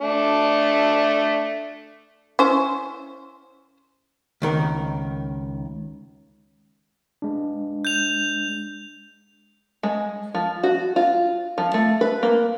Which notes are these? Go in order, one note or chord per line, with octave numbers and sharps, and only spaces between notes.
A3 D4
C#4 E4 C5
C#2 D#3 A#4
G#3 D4
G6 F7
G#3
F3
F#4
F4
F3
A3
B4
A#3